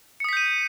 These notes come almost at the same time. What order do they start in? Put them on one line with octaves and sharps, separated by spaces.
C#7 D#6 B6 G6 D#7